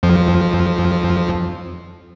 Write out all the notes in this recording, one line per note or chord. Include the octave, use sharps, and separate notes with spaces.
F2 F3